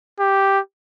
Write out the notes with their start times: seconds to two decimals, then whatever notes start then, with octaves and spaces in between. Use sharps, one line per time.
0.20 G4